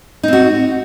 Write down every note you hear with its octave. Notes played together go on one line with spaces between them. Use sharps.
C4 D#4 F#4